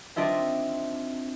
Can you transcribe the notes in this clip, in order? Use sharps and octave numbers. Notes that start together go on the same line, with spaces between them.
C4 D4 F4 D#5 E5